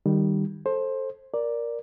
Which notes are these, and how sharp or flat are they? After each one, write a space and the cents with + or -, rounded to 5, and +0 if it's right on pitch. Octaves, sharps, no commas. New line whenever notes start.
D#3 -15 G3 +0
A4 +0 C5 +20
A#4 +10 D5 +0